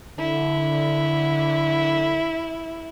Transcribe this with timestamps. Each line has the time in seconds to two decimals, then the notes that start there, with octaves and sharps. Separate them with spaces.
0.19 D3 E4